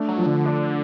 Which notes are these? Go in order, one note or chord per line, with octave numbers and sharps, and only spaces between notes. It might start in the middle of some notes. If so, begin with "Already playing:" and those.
Already playing: A3 D4
F#3
F3
D3
D4